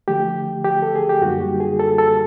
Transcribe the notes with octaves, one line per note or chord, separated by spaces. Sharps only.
D3 F3 A3 G4
G4
A4
G#4
G4
F#2 D3 G3 A#3 D#4 F#4
G4
G#4
A4
A4